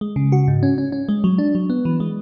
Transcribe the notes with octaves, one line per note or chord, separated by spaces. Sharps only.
G#3
C#3
F#4
G#2
C#4
C#4
C#4
G#3
F#3
D4
F#3
B3
E3
G#3